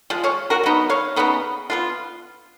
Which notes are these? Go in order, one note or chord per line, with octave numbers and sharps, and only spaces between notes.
F3 G#3
C#5 F5
F#4 A#4
F#3 B3 D#4
C#5 F5
C#3 F#3 B3 D#4
F3 B3 F4